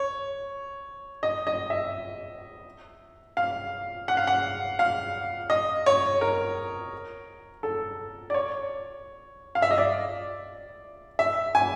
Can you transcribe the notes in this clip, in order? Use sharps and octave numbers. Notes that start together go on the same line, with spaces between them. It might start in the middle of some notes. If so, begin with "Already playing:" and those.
Already playing: C#5
D#5
D#5
E5
F5
F#5
F5
F#5
F5
D#5
C#5
A#4
A4
D5
C#5
F5
E5
D#5
D5
E5
G#5